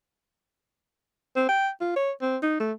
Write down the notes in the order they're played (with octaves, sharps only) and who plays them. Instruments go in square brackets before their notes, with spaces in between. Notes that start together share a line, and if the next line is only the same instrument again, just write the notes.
[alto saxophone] C4
G5
F4
C#5
C4
D#4
A3